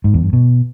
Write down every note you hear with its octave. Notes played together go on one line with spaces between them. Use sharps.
G#2
E2
G2
B2